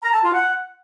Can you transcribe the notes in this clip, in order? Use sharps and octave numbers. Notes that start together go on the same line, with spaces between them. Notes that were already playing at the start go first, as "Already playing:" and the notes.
A#5
A5
F4
F#5